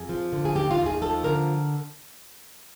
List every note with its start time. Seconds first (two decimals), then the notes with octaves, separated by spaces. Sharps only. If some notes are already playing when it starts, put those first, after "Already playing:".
Already playing: F2 G#4
0.09 F3
0.33 D3
0.45 G#4
0.55 D#2 G4
0.71 F4
0.78 D#2
0.86 G#4
1.02 F3 A4
1.24 D3 A#4